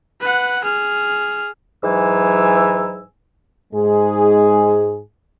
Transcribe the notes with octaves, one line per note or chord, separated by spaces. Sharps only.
B4 F#5
G#4 F6
G#2 E3 F#3 G#5 E6
G#2 G#3 G#4